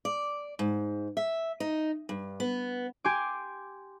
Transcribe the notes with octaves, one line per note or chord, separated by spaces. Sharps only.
D5
G#2
E5
D#4
G2
B3
G4 G#5 C6 D6